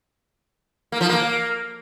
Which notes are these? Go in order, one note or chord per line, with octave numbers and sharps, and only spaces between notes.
A#3
F3
A#3